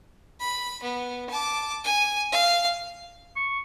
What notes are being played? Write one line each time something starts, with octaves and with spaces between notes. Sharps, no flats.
B5
B3
A5 D6
G#5
F5
C#6